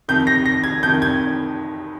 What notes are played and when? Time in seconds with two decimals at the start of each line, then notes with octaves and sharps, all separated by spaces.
0.08 F2 C3 D#3 G6
0.27 A#6
0.46 A#6
0.64 G#6
0.83 F2 C3 D#3 G6
1.02 G#6